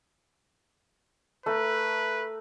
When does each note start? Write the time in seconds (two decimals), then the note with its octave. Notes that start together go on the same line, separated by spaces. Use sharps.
1.46 A3 A#4 B4